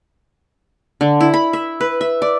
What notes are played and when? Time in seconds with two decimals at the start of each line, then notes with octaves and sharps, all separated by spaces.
1.01 D3
1.21 E4
1.34 B5
1.53 E5
1.81 B4
2.01 E5
2.22 D5